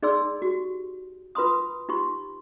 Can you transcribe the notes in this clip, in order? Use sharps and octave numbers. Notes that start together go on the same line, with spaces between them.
D#4 G#4 D5 C6 E6
F#4 G4
F4 B4 B5 C6 D#6
D#4 F4 G4 C6 C#6